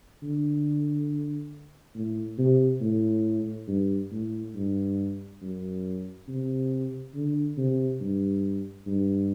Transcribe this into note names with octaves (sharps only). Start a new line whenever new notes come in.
D3
A2
C3
A2
G2
A2
G2
F#2
C3
D3
C3
G2
G2